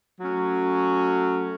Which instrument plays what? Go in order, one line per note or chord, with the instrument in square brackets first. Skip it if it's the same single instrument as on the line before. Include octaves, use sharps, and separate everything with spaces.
[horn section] F#3 A3 C#4